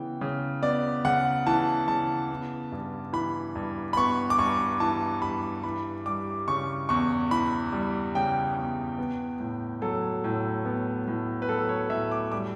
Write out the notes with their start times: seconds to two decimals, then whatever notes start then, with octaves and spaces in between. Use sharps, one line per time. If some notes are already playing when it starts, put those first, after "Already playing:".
Already playing: C#3 E3 B3 G5
0.21 C#3
0.62 B3 D5
1.05 C#3 F#5
1.47 E3 A5
1.88 C#3 A5
2.30 B3
2.72 G2
3.13 E3 B5
3.55 G2
3.93 B5
3.97 B3 C#6
4.30 D6
4.39 G2 C#6
4.80 E3 A5
5.22 G2 B5
5.64 E3 B5
6.06 G3 D6
6.48 C#3 C#6
6.89 E2 C#6
7.31 E3 B5
7.72 G3
8.15 C#3 G5
8.56 E2
8.98 B3
9.40 A2
9.82 F#3 A4
10.24 A2
10.65 B3
11.07 A2
11.42 B4
11.49 F#3 A4
11.69 C#5
11.90 A2 E5
12.11 D6
12.32 G3 D6